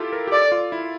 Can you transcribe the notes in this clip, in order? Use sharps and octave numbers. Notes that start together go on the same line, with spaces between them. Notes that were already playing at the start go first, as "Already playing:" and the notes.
Already playing: E4 F4 G4 A4
A#4
G4
A4 D5
F4
E4